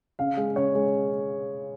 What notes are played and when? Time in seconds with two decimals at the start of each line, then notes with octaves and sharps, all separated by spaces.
0.19 C#3 F5
0.37 G#3
0.56 C#3 C#5
0.75 G#3